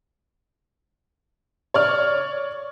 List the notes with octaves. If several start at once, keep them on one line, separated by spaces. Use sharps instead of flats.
C#5 D5 F6